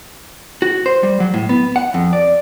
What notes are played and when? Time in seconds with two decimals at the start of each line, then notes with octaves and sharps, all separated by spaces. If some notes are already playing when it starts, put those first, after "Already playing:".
0.62 F#4
0.86 C5
1.03 G3
1.20 F#3
1.34 A2
1.49 B3
1.76 F#5
1.94 F2
2.13 D5